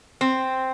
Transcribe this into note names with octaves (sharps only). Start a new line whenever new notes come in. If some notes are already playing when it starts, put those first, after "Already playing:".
C4